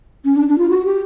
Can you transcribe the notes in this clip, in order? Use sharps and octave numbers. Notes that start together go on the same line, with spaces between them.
C#4
D4
D4
F4
F#4
G4